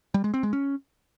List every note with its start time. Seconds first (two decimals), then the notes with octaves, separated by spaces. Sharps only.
0.14 G3
0.24 G#3
0.34 C4
0.43 G#3
0.53 C#4